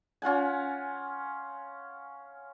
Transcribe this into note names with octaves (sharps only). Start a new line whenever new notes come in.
C#4 F4 F#5 G#5